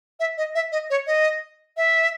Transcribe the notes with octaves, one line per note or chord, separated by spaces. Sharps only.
E5
D#5
E5
D#5
C#5
D#5
E5